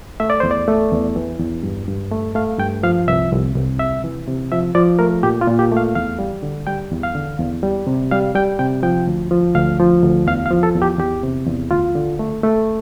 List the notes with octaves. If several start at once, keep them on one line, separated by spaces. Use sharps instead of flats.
A3 E5
D5
E2 C5
D5
A3
E2
E3
E2
G2
G2
A3
A3 F5
G2 G5
F3 F5
C2 E5
C2
C2
C3 E5
E3
C3
F3 E5
F3 D5
A3 A#4
A#2 G4
F4
A#2
G4
A3 F5
E2 F5
G3
D3
G3 G5
E2
F5
D3
E2
G3
C3
G3 F5
G3 G5
C3 G5
F3 G5
D2
F3
D2 F5
F3
D2
E2 F5
F5
F3
A4
E2
G4
E2 G4
C3
E2
D2 F4
D3
A3
A3